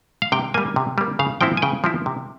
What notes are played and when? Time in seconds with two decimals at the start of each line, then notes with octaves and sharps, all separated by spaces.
0.22 F5
0.32 C3 G5
0.54 G3 A#3 G#5
0.76 C3
0.98 G3 A#3
1.19 C#3 F5
1.41 F3 C4 E4 G5
1.57 G#5
1.62 C#3 G5
1.84 F3 C4 E4
2.06 C3